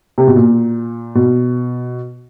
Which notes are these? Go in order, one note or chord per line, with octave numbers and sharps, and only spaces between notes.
C3
B2
A#2
B2